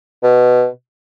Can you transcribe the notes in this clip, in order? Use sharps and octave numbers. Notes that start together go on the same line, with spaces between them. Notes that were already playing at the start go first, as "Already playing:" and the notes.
B2